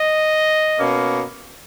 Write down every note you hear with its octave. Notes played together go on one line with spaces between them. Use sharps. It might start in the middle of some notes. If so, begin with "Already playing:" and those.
Already playing: D#5
B2 A#3 C#4